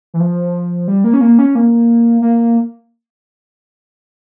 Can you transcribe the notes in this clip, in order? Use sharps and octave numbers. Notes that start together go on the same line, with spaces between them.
E3
F3
G3
A#3
C#4
A#3
C#4
A#3
A#3